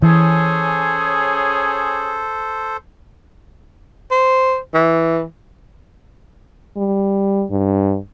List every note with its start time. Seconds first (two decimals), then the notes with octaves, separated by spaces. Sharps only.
0.02 E3 C#4 G#4 A4 C5
4.11 C5
4.74 E3
6.77 G3
7.50 G2